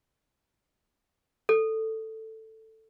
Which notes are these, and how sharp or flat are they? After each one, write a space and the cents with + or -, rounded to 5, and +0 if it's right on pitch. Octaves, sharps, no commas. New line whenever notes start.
A4 +10